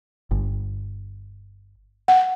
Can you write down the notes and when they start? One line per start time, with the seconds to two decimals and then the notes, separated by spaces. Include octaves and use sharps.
0.31 G1
2.08 F#5